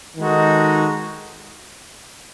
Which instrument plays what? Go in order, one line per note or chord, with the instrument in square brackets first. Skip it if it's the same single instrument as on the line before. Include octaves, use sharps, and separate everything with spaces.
[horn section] D#3 G#3 D#4 F#4 A4